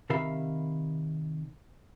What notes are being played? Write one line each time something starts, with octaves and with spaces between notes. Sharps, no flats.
C3 D#3 A#4 E5 F5 B5